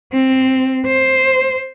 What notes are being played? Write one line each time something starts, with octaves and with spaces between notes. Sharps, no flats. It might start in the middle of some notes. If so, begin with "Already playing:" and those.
C4
C5